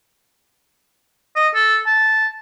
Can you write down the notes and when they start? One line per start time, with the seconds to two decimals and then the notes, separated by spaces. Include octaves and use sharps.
1.36 D#5
1.54 A4
1.86 A5